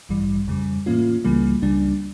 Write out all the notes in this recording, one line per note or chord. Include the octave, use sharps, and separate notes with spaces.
A1 G2 E3 G3
F2 C#3 G3
A2 E3 A#3 C#4 F4
C#2 C#3 E3 G3 A#3
C#2 C#3 G3 D4